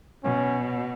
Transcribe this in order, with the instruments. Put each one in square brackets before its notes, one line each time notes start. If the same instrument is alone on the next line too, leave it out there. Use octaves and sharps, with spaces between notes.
[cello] B2 [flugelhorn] C#4